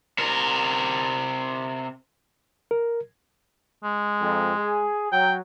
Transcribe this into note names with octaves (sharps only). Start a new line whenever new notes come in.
C3 A#4
A#4
G#3
F2
G#4
F#3 G5